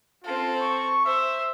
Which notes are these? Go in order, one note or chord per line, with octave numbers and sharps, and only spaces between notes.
C4 F4 A4
C#6
C5 E5